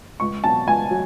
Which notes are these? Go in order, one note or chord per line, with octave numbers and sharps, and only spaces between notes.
C#2 C#6
B2 F#3 A5
C#2 G#5
F#3